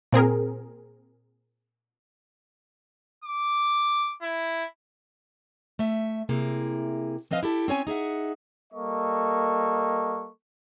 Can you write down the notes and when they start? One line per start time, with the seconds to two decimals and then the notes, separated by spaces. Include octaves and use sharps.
0.12 A#2 C4 G#4 A#4
3.24 D6
4.22 E4
5.79 A3 E5
6.29 C3 A#3 E4 G#4
7.31 F3 C4 B4 D#5 F5
7.43 E4 G4 A4
7.68 C4 C#4 C#5 G#5
7.87 D#4 G#4 E5 F#5
8.72 G3 A#3 A4 D#5 C#6